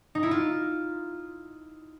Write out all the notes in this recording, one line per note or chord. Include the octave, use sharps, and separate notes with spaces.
D#4
E4
F4